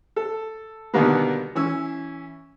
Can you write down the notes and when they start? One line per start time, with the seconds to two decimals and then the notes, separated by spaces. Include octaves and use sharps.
0.16 A4
0.94 B2 D3 D#3 G3 A#3 B3
1.55 E3 C#4 E6